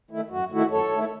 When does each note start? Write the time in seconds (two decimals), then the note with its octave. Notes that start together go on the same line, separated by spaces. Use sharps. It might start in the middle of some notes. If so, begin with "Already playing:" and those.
0.10 D#3 A3 E4
0.30 F#2 F#4
0.52 D#3 A3 E4 F#4
0.71 F#2 A4 C#5
0.91 D#3 A3 E4